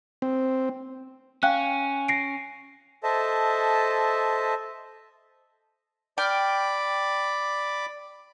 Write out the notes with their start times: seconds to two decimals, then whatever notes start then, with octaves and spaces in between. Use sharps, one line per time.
0.22 C4
1.43 C#4 F5 G5 F#6
2.08 A#6 C7 D7
3.03 A4 C5 D#5 E5 A5
6.18 D5 G5 B5 D6 F6